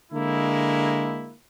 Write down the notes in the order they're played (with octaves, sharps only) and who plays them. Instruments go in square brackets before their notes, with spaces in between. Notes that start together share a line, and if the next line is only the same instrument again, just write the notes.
[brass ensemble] D3 G#3 A#3 E4